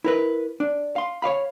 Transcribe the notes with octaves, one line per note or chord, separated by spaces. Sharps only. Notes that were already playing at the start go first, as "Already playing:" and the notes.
E4 A#4 B4
D4
F5 C6
C#5 D5 F5 B5